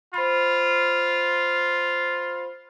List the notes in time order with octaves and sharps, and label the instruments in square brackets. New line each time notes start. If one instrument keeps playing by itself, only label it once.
[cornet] F4 [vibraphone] C5 B5